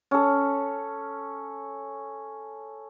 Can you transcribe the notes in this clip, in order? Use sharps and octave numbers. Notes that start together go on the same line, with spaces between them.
C#4 A4